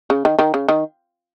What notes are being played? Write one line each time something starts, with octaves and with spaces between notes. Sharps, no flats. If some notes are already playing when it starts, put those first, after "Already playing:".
C#3
D#3
D#3
C#3
D#3